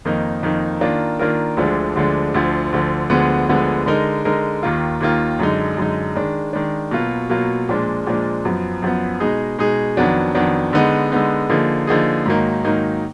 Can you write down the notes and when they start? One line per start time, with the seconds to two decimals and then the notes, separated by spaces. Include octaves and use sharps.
0.05 F2 D#3 A#3 D#4
0.43 F2 D#3 A#3 D#4
0.81 D#3 A#3 D4 F4 A#4
1.19 D#3 A#3 D4 F4 A#4
1.57 D2 D3 F3 G#3 D4
1.96 D2 D3 F3 G#3 D4
2.34 D2 D3 F3
2.72 D2 D3 F3
3.10 D2 D3 F3 G#3 B3
3.48 D2 D3 F3 G#3 B3
3.86 D3 G#3 D#4 A#4
4.25 D3 G#3 D#4 A#4
4.63 D#2 D#3 A#3 F4
5.00 D#2 D#3 A#3 F4
5.39 F#2 D3 G#3 D#4
5.77 F#2 D3 G#3 D#4
6.15 D#3 G#3 D4
6.53 D#3 G#3 D4
6.91 B2 F#3 A#3 F4
7.29 B2 F#3 A#3 F4
7.69 A#2 F3 G#3 D4
8.06 A#2 F3 G#3 D4
8.45 F#2 F3 B3
8.82 F#2 F3 B3
9.20 B2 G#3 D#4 G#4
9.59 B2 G#3 D#4 G#4
9.97 F2 D#3 F#3 B3 D4
10.35 F2 D#3 F#3 B3 D4
10.73 D3 G#3 B3 D#4
11.12 D3 G#3 B3 D#4
11.50 D3 F3 A#3 D#4 G#4
11.87 D3 F3 A#3 D#4 G#4
12.25 G#2 D#3 F#3 A#3 D#4
12.64 G#2 D#3 F#3 A#3 D#4